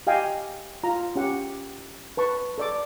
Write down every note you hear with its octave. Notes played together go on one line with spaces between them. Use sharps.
G4 D#5 F5 G5 G#5
F4 A#5
C#4 G4 F#5
B4 A5 C#6
A4 D5 D6